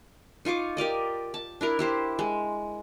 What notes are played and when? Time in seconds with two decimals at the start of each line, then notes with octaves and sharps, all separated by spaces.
0.45 D#4 F4 C#6 D6
0.77 G4 A#4 D5 D#5
1.34 A5
1.61 D4 E4 A#4
1.79 E4 G4 C5
2.19 G#3